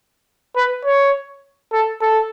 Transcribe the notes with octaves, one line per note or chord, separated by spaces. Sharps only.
B4
C#5
A4
A4